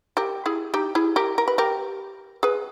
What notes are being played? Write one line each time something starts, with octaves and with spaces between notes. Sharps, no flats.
G4 A#4
E4 G#4
D#4 G4
E4 G#4
G4 A#4
A#4
B4
G4 A#4
G#4 B4